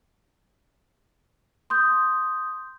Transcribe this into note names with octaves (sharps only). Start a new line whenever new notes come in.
C6 D#6 G6